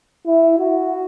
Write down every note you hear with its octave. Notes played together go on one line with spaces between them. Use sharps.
E4
F#4